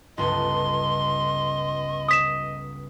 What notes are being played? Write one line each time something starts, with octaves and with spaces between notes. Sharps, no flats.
G1 C#2 A4 D#5 C6
D#6 B6 E7